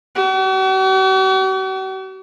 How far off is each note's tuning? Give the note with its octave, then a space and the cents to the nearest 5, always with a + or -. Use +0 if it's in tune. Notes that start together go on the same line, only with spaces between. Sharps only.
F#4 +45